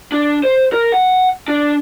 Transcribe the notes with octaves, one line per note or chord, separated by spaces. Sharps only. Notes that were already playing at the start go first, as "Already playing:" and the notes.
D4
C5
A#4
F#5
D4